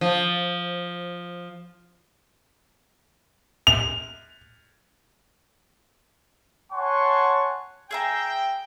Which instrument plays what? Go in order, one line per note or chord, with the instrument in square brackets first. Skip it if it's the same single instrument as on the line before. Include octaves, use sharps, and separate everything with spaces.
[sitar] F3
[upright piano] F7
[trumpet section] C#5 F#5 G#5 A5 C6 C#6
[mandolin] G#4 E5 A#5 [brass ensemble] G5